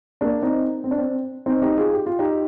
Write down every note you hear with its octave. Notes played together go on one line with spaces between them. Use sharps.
A#3 D4
C4 D#4
C4
D4
C4
C4 D#4
D#4 G4
F4 G#4
G4
F4
D#4 G4